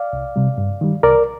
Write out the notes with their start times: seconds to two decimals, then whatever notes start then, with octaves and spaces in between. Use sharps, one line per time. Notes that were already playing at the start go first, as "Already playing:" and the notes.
Already playing: D5 F5
0.13 C2
0.36 C3 G3
0.58 G2
0.81 D#3 G3
1.03 C2 A#4 D5